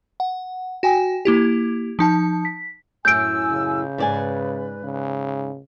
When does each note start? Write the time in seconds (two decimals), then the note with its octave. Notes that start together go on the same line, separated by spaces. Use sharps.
0.20 F#5
0.83 F#4 G5 G#5
1.25 A#3 E4 G4
1.99 F3 D#4 A5
2.45 B6
3.05 F#2 A2 G#5 E6 G6 D7
3.51 C#3
3.98 G#2 B4 D5 G#5
4.83 C#3